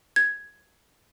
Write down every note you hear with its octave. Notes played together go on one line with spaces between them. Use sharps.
G#6